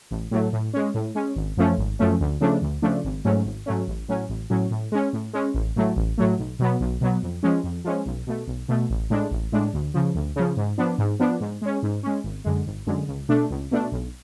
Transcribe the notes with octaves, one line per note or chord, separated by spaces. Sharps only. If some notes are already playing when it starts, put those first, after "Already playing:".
A1
A2 F#3 A3
A2
G#3 C#4
A2
G#3 C#4
G#1
F#2 F3 A3 C#4
G#1
F#2 F3 A3 C#4
D2
C#3 F3 A3 D4
D2
C#3 F3 A3 D4
G#1
G#2 F#3 A3 C#4
G#1
G#2 F#3 A3 C#4
A1
A2 F#3 C#4
A1
A2 F#3 C#4
A2
G#3 C#4
A2
G#3 C#4
A1
A2 F#3 A3
A1
A2 F#3 A3
B1
B2 F#3 B3
B1
B2 F#3 B3
F2
F3 G#3 C#4
F2
F3 G#3 C#4
B1
B2 A3
B1
B2 A3
A1
A2 G#3 D4
A1
A2 G#3 D4
D2
C#3 F3
D2
C#3 F3
G#2
F3 B3 D4
G#2
F3 B3 D4
G#2
G#3 C#4
G#2
G#3 C#4
G#1
F#2 D3 G#3
G#1
F#2 D3 G#3
C#2
B2 A3 D4
C#2
B2 A3 D4
B1